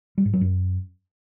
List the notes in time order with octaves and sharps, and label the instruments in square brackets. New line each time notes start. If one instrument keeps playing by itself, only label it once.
[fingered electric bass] G3
G#2
F#3
F#2